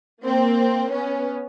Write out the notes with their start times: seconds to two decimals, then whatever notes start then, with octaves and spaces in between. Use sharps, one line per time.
0.24 A#3 C4
0.92 B3 C#4